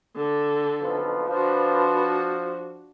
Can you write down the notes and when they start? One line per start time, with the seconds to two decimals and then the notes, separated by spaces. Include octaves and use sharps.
0.16 D3 A4
0.81 B1 F2 F3 B4
1.29 F3 D4 F#4